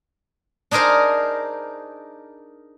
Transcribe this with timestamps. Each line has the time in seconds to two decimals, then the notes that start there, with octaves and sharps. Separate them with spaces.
0.71 D4 D#4 G#4 A#4 C5